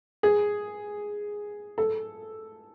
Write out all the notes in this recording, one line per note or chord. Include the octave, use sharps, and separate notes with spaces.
G#4
A4